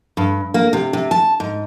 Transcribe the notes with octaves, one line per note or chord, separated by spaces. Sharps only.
G2
A#3
C3
C3
A5
G#2